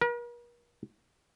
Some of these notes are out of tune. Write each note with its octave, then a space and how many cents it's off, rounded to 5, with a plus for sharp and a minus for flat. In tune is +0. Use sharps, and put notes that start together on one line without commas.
A#4 +45